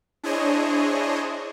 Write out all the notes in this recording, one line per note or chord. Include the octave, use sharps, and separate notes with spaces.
D4 E4 G#4 C5 C#5 D#5